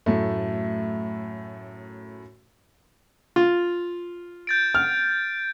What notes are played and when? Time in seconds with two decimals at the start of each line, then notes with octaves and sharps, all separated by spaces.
0.06 F#2 A2 A3
3.36 F4
4.47 G6 A6 D7
4.75 F6